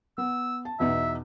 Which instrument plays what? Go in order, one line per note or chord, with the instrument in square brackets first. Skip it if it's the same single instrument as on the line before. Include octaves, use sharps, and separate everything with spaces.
[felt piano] B3 [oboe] E6
[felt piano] A5
[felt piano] E2 B2 D#4 [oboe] E5